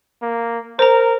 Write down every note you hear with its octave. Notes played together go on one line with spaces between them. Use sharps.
A#3
A#4 C5 A#5